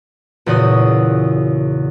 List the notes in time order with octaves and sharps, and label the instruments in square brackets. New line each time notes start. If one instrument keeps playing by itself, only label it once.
[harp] E2 A#2 C#3 F#4 D#6